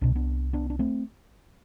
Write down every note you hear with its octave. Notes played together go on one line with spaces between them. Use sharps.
C2 B2 D4
B3 D4
B3 D4
D4
A3 C4